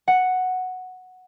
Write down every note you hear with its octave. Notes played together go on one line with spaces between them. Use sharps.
F#5